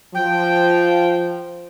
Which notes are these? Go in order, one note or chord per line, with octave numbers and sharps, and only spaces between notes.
F3 G5